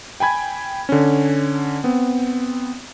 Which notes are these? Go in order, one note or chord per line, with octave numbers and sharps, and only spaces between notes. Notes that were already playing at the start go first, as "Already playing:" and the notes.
G5 G#5 B5 G#6
D3 C#4
B3 C4